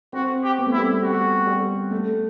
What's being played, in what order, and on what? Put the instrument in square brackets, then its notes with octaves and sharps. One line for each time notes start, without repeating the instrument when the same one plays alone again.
[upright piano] C4 [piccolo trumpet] F#4
[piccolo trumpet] G4
[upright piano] B3
A3
[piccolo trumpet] E4
[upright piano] G3
A3
[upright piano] G3 [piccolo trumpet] F#4
[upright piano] G3
A3